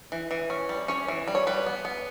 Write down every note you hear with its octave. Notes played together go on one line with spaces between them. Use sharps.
E3
E3
C#4
G3
C#4 C#5
E3
G3
C#5
G3 B4
B3
B3